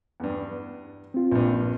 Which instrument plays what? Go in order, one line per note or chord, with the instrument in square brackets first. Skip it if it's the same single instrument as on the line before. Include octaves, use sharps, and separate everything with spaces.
[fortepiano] E2 G2
[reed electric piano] C4 F4
[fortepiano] A#1 G2